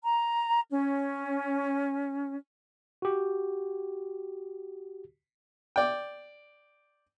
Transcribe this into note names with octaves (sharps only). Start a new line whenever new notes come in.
A#5
C#4
F#4 G4
D5 G5